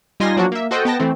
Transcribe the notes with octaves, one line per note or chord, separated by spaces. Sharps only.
G3 D#4 F4 G#5 C6 A#6
F3 F#3 A#3 D4 F#4
A#3 E5
F#4 A4 C5 D#5 F#5 G5
B3 G5 A5 A#6
E3 A3 C4